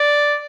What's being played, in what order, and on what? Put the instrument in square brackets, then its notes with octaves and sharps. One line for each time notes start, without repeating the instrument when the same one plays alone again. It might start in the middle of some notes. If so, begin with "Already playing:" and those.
Already playing: [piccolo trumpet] D5